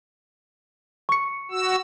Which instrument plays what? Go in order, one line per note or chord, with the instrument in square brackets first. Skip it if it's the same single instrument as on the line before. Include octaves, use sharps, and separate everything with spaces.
[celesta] C#6 C#7
[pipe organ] F#4 E6